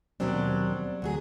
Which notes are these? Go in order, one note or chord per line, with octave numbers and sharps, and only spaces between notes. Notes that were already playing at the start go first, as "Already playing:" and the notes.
D#2 B2 F#3 G3 C4 D4
D2 F#3 G#4